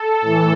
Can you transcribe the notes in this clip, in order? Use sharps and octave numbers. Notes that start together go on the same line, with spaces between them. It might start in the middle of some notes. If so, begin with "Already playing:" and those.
Already playing: A4
A2 E3